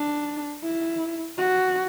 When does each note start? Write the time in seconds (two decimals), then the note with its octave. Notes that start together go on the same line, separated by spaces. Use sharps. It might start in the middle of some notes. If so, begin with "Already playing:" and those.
Already playing: D4
0.63 E4
1.38 F#4